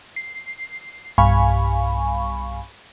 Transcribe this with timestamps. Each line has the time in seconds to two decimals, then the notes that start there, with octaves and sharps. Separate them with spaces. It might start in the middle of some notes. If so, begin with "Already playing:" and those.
0.16 C7
1.18 B1 G2 F5 G#5 B5 C#6